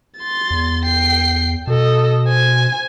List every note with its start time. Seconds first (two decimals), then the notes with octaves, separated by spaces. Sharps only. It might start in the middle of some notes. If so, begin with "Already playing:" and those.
0.19 C6 A6
0.51 E2
0.85 G5 C7
1.67 B2 A4 D#5
2.26 C5 G#5